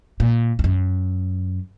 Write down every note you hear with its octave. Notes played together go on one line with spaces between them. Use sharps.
A#2
E2
F#2